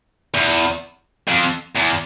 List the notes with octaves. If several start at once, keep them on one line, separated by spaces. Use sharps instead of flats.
E2
F2
E2